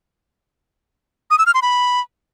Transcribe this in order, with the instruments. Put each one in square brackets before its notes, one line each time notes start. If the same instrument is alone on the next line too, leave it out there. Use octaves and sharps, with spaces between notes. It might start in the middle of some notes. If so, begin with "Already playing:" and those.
[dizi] D#6
E6
F6
C6
B5